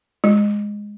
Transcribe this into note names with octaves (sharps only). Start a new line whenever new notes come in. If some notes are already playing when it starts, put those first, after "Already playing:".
G#3